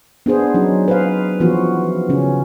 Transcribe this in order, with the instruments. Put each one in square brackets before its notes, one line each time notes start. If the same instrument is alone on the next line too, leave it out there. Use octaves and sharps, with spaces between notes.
[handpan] B3 D4 G#4 C5
F#3 C#4 D#4
B4 C5 F5
E3 F3 B3 F4 F#4
C#3 C#4